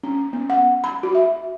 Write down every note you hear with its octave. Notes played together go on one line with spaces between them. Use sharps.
C#4
B3
F#5
B5
F#4
E5